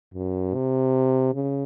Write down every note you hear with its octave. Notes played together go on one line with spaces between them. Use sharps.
F#2
C3
C#3